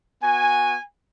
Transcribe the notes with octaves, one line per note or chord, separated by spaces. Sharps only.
B3 F#4 G#5